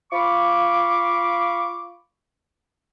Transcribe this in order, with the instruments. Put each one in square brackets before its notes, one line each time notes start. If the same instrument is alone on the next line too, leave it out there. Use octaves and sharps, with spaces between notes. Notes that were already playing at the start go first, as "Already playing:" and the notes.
[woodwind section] F4 F5 B5 C#6 D6